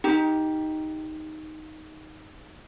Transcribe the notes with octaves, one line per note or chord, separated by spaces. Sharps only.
D#4 G4